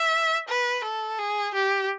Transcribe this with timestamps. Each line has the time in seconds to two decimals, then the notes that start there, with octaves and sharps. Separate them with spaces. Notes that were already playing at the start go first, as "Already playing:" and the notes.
Already playing: E5
0.48 B4
0.84 A4
1.18 G#4
1.54 G4